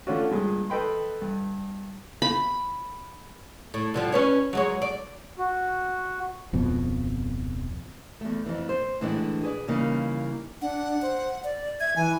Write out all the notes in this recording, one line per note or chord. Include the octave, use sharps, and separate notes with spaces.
D3 A3 C#4 F4 F#4
G2 A#2 G#3
A4 B4 D#5 G5 B5 C6
G2
B5
A2
D3 F3 G3
C#4 B4 C#5
F#3 G#3 C#5
D5
F#4
D1 F2 B2
E2 A3
F2 E3
C5
A2 D3 E3 G#3 C#4 D4
G#4 B4 D5
C#3 E3 G3 A#3 D#4
D4 F#5
C5
D5
E5 G#6
E3 G#5